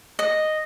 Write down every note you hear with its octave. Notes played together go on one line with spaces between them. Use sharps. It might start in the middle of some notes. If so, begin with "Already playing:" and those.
D#5